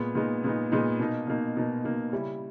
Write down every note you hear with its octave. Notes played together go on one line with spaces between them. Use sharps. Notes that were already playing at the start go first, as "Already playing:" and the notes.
Already playing: A#2 G#3 B3
A#2 G#3 B3 D#4
A#2 G#3 B3 D#4
A#2 G#3 B3 D#4
B2 A#3 D#4
B2 A#3 D#4
B2 A#3 D#4
B2 A#3 D#4
C#3 G3 C#4 E4